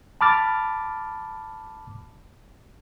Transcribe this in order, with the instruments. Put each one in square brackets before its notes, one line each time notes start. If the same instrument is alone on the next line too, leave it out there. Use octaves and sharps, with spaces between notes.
[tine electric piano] A5 B5 D6 F6 A6